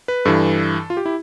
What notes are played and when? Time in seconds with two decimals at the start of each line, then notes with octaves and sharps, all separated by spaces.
0.08 B4
0.25 G2 E3 A4
0.90 F4
0.97 G4
1.06 E4